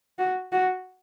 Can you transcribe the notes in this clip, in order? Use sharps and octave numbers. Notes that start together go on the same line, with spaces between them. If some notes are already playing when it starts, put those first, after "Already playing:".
F#4
F#4